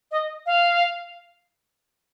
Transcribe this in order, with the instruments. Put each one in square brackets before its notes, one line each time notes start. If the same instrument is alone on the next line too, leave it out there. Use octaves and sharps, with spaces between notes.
[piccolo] D#5
F5